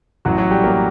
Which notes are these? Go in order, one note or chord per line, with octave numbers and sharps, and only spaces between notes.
A1 A2 F#3 F#4
F#3 F#4
G3 G4
A#3 A#4